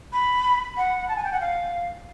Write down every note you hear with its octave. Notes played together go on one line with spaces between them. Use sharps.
B5
F#5
A5
G#5
G5
F#5
F5